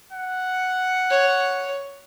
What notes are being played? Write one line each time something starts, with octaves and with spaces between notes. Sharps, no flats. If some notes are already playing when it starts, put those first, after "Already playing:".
F#5
C#5